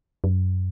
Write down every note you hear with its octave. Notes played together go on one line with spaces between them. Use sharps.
F#2